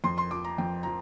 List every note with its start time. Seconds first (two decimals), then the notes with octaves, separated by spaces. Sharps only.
0.04 F2 C6
0.18 C6
0.31 F3 D6
0.44 A#5
0.58 F2 G5
0.83 F3 A#5